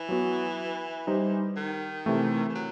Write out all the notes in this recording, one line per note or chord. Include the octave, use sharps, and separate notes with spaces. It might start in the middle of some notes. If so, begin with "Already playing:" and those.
Already playing: E3
F#3 B3 F#4
G3 D#4 G4 C5
D#3
C3 E3 A3
E3
F#3